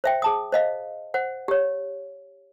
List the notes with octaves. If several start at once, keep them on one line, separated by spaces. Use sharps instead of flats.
C5 E5 G5
G#4 A5 D#6
C5 D#5 F5
C5 F#5
G4 C#5